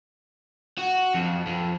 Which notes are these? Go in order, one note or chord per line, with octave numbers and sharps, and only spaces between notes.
F#4
F2
F2